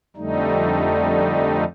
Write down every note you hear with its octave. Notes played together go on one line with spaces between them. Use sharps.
F2 D3 G3 A3 D#4